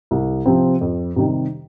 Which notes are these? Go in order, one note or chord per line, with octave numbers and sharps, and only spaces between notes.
C2
C3 F3 C4
F2
C3 D#3 G3